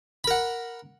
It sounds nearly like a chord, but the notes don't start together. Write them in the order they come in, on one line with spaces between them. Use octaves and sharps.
B5 A#4 F#5